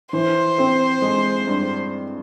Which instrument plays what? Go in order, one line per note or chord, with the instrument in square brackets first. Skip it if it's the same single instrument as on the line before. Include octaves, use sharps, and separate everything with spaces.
[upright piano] E3 [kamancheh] C5
[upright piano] C4
G#3
G2